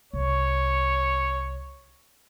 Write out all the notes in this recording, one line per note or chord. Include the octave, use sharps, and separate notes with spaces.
C2 C#5